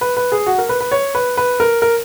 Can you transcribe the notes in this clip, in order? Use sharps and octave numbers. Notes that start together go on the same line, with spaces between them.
B4
B4
G#4
F#4
A#4
B4
B4
C#5
B4
B4
A#4
A#4